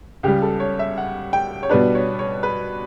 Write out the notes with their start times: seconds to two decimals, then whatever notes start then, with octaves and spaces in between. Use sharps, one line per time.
0.23 C#2 C#3 G3 G4
0.42 A4
0.60 C#5
0.79 E5
0.98 F#5
1.33 G5
1.63 C#5
1.69 B2 G3 B3 D4 B4
1.95 C#5
2.19 C#5
2.43 B4